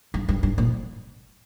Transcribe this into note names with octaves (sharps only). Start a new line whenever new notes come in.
G2
G2
G2
A#2